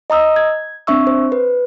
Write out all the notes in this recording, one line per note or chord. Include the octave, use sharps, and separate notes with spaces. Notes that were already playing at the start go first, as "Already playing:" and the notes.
D#5 A#5 D#6 E6
G#6
C4 D4 E5 C#6 E6
C5
B4